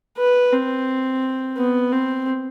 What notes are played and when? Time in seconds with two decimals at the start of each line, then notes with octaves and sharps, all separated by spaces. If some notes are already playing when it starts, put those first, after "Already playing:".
0.18 B4
0.53 C4
1.57 B3
1.92 C4